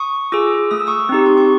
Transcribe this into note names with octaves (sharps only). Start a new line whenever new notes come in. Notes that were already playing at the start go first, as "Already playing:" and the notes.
Already playing: C#6 D#6
F4 G#4 D6 E6
A3 D#6
E6
C#6 D#6
C4 D#4 G4
C6
C#6